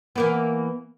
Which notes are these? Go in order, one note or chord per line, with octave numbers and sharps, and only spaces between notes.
E3 A#3 B3